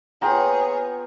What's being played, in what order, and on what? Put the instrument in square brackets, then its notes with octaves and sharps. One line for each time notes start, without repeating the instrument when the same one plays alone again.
[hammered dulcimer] B3 F4 [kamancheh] G#4 C#5 [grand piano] G5 A#5